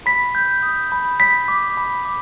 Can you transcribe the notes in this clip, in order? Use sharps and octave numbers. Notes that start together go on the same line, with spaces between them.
B5 B6
G6
D#6
B5
B5 B6
D6
B5
D6